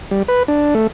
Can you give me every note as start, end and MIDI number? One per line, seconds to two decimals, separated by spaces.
0.11 0.23 55
0.28 0.43 71
0.48 0.74 62
0.75 0.87 57